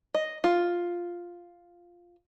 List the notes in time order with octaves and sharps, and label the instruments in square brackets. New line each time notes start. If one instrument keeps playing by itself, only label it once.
[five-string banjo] D#5
F4